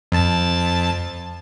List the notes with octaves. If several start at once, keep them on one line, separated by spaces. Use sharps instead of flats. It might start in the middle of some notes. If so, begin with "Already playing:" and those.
F2 A5 A6